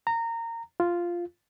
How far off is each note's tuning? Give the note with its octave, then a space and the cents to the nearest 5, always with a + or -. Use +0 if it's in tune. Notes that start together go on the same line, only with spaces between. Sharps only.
A#5 -20
F4 -5